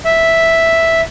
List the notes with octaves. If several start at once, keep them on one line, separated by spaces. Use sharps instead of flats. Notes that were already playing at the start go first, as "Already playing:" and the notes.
E5